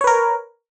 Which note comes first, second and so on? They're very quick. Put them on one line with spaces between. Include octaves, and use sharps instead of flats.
C#5 B4 A#4